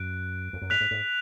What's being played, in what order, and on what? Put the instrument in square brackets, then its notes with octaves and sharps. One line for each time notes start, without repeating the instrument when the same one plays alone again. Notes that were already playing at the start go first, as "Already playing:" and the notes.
Already playing: [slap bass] F#2 [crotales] F#6 D7
[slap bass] F2
F#2
[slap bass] G#2 [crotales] F#6 B6 F7
[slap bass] G#2
G#2